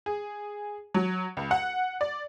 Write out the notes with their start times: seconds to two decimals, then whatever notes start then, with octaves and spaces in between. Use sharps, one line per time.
0.06 G#4
0.94 F#3
1.37 C#2
1.51 F#5
2.01 D5